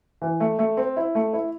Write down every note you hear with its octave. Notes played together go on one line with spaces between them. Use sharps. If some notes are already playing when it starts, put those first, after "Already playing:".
E3
A3
A3
C4
E4
A3
E4